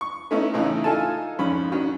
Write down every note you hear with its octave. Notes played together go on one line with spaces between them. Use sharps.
C#6
A3 B3 C#4 D#4 E4
A2 C#3 E3 C#4 D#4 E4
D#4 F4 A4 G#5 A5
F2 G#2 C#4 B5
D#3 F#3 C#4